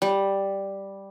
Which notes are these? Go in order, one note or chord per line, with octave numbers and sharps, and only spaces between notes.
G3